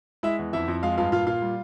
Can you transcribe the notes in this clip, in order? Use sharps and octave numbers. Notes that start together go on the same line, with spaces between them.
G#3 E4 E5
E2
F2 E4 E5
F2
G#3 F4 F5
G2 F4 F5
A#2 F4 F5
A#2 F4 F5
G3